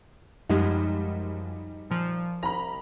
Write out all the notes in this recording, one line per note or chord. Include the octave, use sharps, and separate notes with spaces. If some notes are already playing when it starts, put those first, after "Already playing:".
F#2 F3 G3 G#3 D#4
A#2 F3
C2 A#5 B5